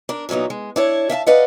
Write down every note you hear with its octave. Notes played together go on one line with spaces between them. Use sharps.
D4 A#4
A#2 E3 F#3 B3 D#4
G#3
D4 E4 C#5
E5 F5 G5 A5
B4 D5 D#5 F5 F#5